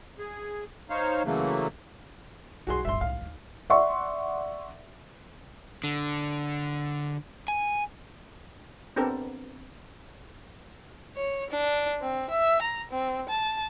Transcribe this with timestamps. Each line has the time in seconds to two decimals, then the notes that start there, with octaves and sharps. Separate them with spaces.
0.19 G#4
0.90 D#4 C5 C#5 F5
1.24 C#3 E3 F#3 A3 A#3
2.67 B1 E2 F#4 G#4 C6
2.85 D1 G1 E5 C6
3.01 C2 A2 F5
3.21 D#2 D#4
3.70 D5 E5 F#5 C6 C#6
5.84 D3
7.48 G#5
8.96 B3 C4 D4 G4 A4 A#4
11.16 C#5
11.51 D4
12.01 C4
12.30 E5
12.62 A#5
12.91 C4
13.29 A5